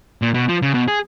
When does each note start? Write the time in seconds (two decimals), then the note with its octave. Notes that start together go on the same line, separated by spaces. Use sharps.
0.22 A#2
0.34 B2
0.49 F3
0.62 C#3
0.74 B2
0.88 G#4